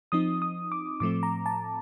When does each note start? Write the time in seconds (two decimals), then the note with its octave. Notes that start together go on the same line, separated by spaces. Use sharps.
0.12 F3 C4 D#4 D#6
0.42 D#6
0.72 D6
1.00 A2 F3 A3 C4 D6
1.23 A#5
1.46 A5